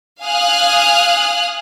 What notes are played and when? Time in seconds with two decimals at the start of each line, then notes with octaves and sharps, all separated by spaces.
0.23 F5 G#5 D#6 F6 F#6